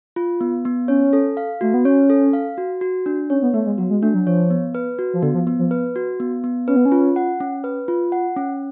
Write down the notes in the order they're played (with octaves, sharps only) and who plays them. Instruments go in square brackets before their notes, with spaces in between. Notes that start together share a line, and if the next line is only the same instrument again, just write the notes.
[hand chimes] F4
B3
B3
[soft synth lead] C#4 [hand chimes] C#5
[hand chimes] A4
F5
[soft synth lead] A3 [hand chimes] F#4
[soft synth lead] B3
[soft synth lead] C#4 [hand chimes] C#5
[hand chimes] A4
F5
F#4
F#4
D4
[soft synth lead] C#4 [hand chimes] C#5
[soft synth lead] B3
[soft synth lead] A3 [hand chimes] B3
[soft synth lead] G#3
[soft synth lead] F#3 [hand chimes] F#4
[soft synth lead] G#3
[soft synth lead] A3 [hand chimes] D4
[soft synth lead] F#3
[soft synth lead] F3 [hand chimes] C#5
[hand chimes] B3
B4
F#4
[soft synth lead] F3
[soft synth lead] D3 [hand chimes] B3
[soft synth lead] F3
[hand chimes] B3
[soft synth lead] F3
[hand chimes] B4
F#4
B3
B3
[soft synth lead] C#4 [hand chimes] B4
[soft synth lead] B3
C#4
[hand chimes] F4
F#5
C#4
B4
F4
F#5
C#4